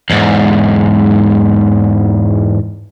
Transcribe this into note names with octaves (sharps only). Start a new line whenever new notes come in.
E2 G#2